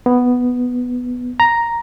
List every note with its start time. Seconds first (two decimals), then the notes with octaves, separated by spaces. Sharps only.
0.06 B3
1.40 A#5